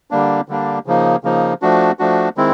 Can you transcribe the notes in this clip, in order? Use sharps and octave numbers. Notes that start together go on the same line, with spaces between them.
D3 G3 A#3 D4
D3 G3 A#3 D4
C#3 F3 A#3 D#4
C#3 F3 A#3 D#4
F3 A3 D4 F#4
F3 A3 D4 F#4
D#3 G#3 C4 E4